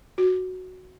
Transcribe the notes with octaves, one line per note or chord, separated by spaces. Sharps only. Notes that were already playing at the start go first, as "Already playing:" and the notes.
F#4